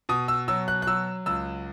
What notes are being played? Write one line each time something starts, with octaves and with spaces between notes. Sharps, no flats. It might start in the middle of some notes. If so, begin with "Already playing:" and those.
B2 D#6
E6
F#3 E6
F#6
F#6
F#3 E6
C#2 E6